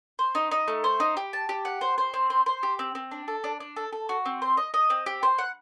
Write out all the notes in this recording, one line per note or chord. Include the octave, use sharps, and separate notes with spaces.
C5
D#4
D#4
A3
C5
D#4
G4
A5
G4
F#5
C5
C5
C4
C5
C5
G4
C4
C4
D4
A4
D4
D4
A4
A4
F#4
C4
C5
D#5
D#5
C4
G4
C5
F#5